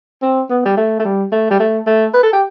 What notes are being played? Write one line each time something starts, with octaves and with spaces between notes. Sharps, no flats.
C4
B3
G3
A3
A3
G3
A3
G3
A3
A3
B4
A4
G4